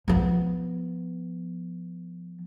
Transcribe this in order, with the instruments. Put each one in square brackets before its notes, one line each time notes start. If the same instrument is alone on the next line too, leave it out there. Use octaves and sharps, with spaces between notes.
[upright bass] F3 B3